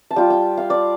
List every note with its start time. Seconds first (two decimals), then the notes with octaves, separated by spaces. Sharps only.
0.11 A5
0.16 G3 F4 G5
0.30 G5
0.57 F5
0.70 D5